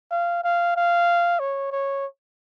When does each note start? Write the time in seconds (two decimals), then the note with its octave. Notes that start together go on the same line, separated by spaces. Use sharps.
0.11 F5
0.44 F5
0.76 F5
1.40 C#5
1.72 C#5